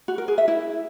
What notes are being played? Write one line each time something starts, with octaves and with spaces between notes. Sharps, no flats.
F#4
A#4
G#4
E5
E4